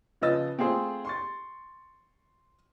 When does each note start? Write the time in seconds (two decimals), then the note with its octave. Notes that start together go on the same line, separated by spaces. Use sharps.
0.21 C#3 F3 B4 D#5 E6 A6
0.58 A3 C4 F4 G#4 C5
1.05 C6 C#6 A6